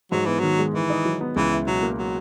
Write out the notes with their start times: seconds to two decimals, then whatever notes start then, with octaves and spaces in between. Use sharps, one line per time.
0.12 G#2 F#3
0.26 E3 B3
0.39 D#3 F#3
0.59 G#3
0.74 D#3 E3
0.90 D#4
1.05 F#3
1.21 B3
1.36 C#2 E3
1.51 E4
1.67 B2 F#3
1.83 A#3
1.98 F#3